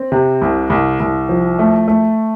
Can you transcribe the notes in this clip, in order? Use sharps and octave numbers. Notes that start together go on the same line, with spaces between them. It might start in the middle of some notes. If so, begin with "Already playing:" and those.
Already playing: C4
C3
C2
C2
C2
F3
A3
A3